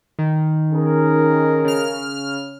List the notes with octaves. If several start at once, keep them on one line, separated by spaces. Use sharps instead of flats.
D#3
C#4 G#4 A#4
C#3 F6